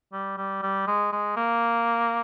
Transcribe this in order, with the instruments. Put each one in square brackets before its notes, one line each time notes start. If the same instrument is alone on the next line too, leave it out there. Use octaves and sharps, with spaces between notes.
[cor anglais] G3
G3
G3
G#3
G#3
A#3